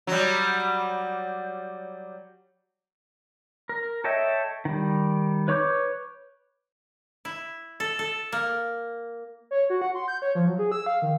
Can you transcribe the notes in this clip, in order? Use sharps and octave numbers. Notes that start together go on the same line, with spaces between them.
F#3 G3
A#4
A4 C#5 D#5 E5 G5
D#3 G3
B4 C#5 C#6 D6 G6
E4
A4
A4
A#3
C#5
F#4
F#5
C6
G6
C#5
F3
F#3
G#4
E6
F5
D#3